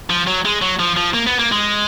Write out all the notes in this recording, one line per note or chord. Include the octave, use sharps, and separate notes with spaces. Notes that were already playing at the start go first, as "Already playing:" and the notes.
F3
F#3
G#3
F#3
F3
F3
A#3
B3
A#3
G#3